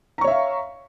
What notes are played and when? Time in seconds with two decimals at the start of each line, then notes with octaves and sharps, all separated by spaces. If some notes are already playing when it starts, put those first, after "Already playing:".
0.18 A#5
0.21 C#6
0.24 C#5
0.28 E5
0.31 F5